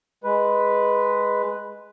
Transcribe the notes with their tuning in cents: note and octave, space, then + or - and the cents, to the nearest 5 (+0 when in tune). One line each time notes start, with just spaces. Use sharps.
G#3 +0 B4 +0